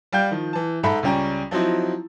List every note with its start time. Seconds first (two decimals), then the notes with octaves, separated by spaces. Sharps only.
0.12 G3 F5 G5 G6
0.31 D#3 F3
0.53 E3 A5
0.83 G#2 A4 E5 B5
1.03 C#2 G3 C#4 G5 A#5
1.51 F3 F#3 C4 D#4 E4